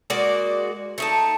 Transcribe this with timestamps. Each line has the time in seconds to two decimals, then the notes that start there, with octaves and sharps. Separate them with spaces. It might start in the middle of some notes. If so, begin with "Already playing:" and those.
0.10 G#3 A#3 F#4 D5
0.98 A3 D#4 A5